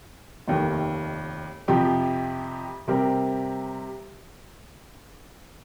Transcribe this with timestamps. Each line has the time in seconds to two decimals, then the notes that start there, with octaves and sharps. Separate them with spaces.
0.48 F1 D#2 D#3
1.68 F2 C3 F3 C4 G4
2.88 C3 G3 C4 G4 A#4